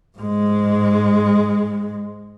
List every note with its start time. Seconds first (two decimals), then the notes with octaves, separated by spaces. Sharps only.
0.18 G#2 G#3